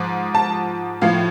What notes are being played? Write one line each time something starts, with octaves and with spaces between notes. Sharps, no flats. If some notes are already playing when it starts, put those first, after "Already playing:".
Already playing: G#2 F3
A5
A2 F3 F5